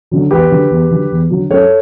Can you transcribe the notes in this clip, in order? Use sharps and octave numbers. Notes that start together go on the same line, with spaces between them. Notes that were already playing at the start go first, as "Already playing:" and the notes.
D3 F#3
E2 G4 B4
D3 F#3
E2
D3 F#3
E2
D3 F#3
F#2 A4 C#5